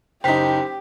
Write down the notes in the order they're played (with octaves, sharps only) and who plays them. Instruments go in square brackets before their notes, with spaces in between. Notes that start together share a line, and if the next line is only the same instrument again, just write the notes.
[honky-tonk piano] F#1 D#4 [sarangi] G4 [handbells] C5 [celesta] G5 B6